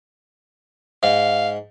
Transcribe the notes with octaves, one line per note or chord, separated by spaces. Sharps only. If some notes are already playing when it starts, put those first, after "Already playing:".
G#2 F5